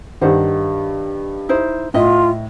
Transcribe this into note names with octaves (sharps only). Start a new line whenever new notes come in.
G2 D#3 C5 F#5
D#4 E4 C5
A2 E4 F4 D#5 E5